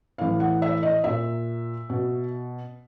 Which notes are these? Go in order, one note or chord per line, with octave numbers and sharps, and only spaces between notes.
A2 E3 F5
F#5
E5
D#5
A#2 E5
B2